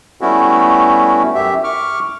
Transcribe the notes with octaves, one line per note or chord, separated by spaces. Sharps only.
G3 A3 B3 C#4 E4 F#4
F#2 G4 E5
C#6 D6 F6